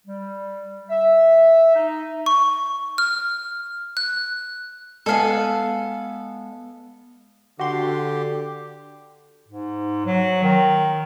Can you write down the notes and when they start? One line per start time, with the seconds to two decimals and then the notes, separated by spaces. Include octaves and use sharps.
0.06 G3
0.90 E5
1.75 D#4
2.26 C#6
2.98 F6
3.97 F#6
5.06 G#3 B3 A4 F5 G#5
7.60 D3 F#4 G4 C6
9.48 G#2
10.06 F#3
10.43 D#3